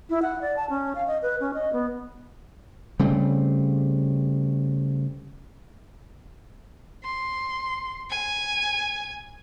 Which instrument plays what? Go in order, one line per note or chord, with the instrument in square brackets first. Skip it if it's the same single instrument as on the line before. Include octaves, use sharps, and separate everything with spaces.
[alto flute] E4
F#5
D5
A5
C#4
F5
D#5
B4
C#4
D#5
B3
[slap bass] C#3 G3 A3 C4
[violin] C6
G#5